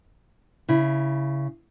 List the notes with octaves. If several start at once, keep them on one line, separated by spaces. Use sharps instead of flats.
C#3 E4